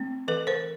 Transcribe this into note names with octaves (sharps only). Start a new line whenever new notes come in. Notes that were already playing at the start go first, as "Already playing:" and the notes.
Already playing: A3 C4
E3 A4 B4
A#4 C5